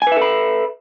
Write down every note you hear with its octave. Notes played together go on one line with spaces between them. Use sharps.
A4 B4 E5 G#5 B5